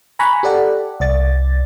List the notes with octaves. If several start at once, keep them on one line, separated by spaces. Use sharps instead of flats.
G#5 A#5 B5 C#6 F#6
G4 A4 D5 F#5
C2 D5 A6